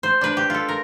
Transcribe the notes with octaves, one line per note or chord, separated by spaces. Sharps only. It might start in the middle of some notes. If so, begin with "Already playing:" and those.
C5
D4 B4
G4
F4 A4
A#4